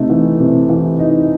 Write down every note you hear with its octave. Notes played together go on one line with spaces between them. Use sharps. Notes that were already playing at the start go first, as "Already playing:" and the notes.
Already playing: C3 A3 D#4
E3
C3
E3
D#4